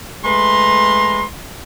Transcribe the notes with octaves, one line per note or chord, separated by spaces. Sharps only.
G#3 A3 B4 A#5 C6